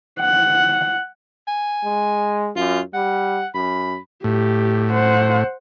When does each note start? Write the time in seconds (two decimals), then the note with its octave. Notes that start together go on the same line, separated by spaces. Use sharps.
0.20 F#5
1.48 G#5
1.84 G#3
2.56 F#2 F4
2.94 G3 F#5
3.55 F#2 B5
4.24 A2 G4
4.92 C5 F#5